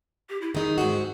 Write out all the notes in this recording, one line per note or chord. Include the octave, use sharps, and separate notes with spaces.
G4
E4
D#3 D#4 G#4
G#2 C4 F#4